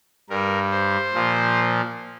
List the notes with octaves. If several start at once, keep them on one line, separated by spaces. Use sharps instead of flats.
G2 G3 A#4
C5
A#2 F3